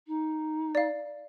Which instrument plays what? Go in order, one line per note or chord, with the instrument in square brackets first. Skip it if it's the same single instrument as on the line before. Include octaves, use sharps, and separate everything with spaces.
[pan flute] D#4
[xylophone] D5 F5